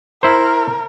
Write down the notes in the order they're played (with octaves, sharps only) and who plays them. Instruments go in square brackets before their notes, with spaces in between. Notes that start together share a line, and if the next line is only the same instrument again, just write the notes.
[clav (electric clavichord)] E4 C5 [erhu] A#4